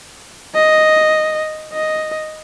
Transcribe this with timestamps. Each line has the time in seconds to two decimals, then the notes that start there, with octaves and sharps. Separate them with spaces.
0.55 D#5
1.73 D#5